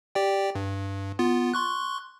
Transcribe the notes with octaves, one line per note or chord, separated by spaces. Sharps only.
G4 D5 G5
G2
B3 F4
C6 C#6 F#6